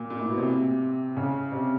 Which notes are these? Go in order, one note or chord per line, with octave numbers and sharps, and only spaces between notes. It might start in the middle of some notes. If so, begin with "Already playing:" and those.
Already playing: A#2
A#2
A2
B2
C3
C#3
C3